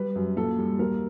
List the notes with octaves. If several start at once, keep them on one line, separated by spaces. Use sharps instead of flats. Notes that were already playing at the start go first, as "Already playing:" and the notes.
Already playing: G3 B4
F#2
A#2 A4
G3
D#2 A#4